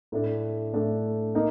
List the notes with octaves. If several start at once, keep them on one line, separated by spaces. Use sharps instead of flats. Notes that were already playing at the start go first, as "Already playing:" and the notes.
A2 A3 D4
A2 A3 D4
A#3 D#4